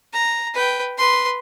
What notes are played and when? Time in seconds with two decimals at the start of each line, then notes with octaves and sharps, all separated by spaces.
0.13 A#5
0.54 B4 G5
0.98 B4 C6